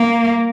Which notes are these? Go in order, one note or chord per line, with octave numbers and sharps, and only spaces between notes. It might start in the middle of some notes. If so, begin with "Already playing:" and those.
Already playing: A#3